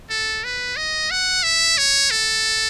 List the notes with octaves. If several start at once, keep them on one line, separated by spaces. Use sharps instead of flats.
A4
B4
D#5
F#5
E5
C#5
A4